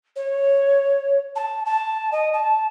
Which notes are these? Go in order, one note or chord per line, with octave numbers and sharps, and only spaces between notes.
C#5
A5
A5
D#5
A5